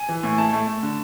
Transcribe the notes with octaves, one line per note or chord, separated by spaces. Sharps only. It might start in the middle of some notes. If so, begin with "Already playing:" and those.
Already playing: G#5
E3
A2
A3 A5
A3
A3
D3